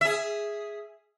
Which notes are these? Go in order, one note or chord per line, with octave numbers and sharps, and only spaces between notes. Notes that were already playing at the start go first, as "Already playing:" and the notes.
G#4 E5